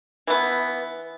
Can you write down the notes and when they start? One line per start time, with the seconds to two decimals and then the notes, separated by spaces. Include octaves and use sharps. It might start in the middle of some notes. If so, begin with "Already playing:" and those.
0.27 E3 B3